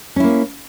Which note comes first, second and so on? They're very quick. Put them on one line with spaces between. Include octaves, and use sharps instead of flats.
C#4 E4 A#3